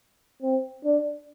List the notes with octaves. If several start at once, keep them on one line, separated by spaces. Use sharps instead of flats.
C4
D4